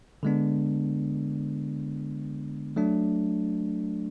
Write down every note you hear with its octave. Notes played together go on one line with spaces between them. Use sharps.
D3 G#3 B3 D4
F#3 A3 D4